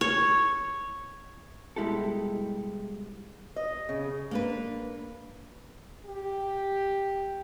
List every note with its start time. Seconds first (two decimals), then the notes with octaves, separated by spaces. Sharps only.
0.01 C#5
1.76 B2 G3 G#3 E4 G4 A4
3.56 D#5
3.89 C#3
4.31 A#3 D4 B4
6.06 G4